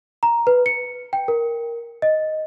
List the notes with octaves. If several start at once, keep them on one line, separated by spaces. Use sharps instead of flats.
A#5
B4
C#7
G5
A#4
D#5